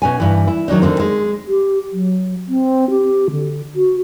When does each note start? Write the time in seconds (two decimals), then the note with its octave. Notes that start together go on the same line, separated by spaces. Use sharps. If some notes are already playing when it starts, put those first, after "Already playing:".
0.02 B2 C#4 G#5
0.20 G2 E3
0.47 E4
0.68 D#3 F#3 D4 D#4
0.82 D3 D#3 A#3 C4
1.00 G#3
1.47 G4
1.92 F#3
2.48 C4
2.90 G4
3.30 D3
3.75 F#4